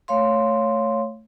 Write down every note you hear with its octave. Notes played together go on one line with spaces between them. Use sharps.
A3 C#5 F5 C6